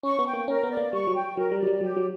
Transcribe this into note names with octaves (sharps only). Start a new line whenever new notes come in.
C#4 C#6
B3
G5
A#3
C#4 A#4
B3
D5
A#3
G3 C#6
F#3
G5
F#3 A#4
G3
F#3 D5
G3
F#3 G4
F#3